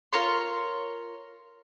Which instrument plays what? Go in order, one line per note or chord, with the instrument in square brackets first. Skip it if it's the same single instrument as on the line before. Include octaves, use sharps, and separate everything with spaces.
[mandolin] F4 A#4 C#5 C6